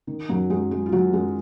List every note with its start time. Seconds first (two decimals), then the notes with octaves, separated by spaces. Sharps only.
0.07 D#3
0.29 F#2 F#3 F#4
0.50 F#2 G#3 G#4
0.71 G#3 G#4
0.86 F4
0.92 D#3 F#3 F#4
1.13 F#2 G#3 G#4